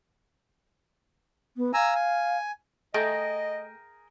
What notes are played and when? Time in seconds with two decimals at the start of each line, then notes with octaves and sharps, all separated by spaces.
1.56 B3
1.74 F5 G#5 A#5 E6
1.95 G#5
2.94 A3 G#4 A#4 D#5 G5